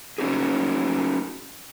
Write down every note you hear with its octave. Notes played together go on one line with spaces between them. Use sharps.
C#4 D#4 F#4 G#4